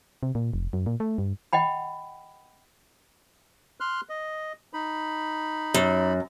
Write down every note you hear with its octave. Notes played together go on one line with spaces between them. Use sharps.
C3
A#2
F1
F#2
A#2
A3
G2
D#5 F#5 G5 B5
C6 F6 F#6
D#5
D#4 B5
F#2